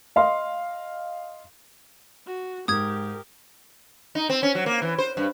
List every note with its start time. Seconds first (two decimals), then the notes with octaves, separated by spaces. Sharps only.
0.16 D#5 F5 C6
2.26 F#4
2.68 G#2 G4 A#4 D#6 G#6
4.15 D#4
4.29 C4
4.43 C#4
4.55 F#3
4.66 A#3
4.82 E3
4.98 C5
5.17 G2